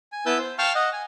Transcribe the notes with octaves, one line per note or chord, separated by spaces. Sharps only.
G#5
B3 E4 B4 A5 E6 G6
C5
F5 G5 A5 C#6 F6
D#5 F#5
G#5